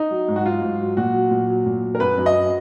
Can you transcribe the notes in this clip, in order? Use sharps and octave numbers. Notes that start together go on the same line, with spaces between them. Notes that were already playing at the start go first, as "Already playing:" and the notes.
Already playing: D#4
F#3
G#2
F#4
F#3 F4
G#2
F#3
A#2 F#4
F#3
A#2
F#3
A#2
F#3
A#4
F#2 B4
F#2
D#5
F#3